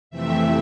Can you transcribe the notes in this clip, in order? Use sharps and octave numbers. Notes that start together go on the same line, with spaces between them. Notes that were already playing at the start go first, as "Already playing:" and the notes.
F2 C3 E3 A3 C4 E5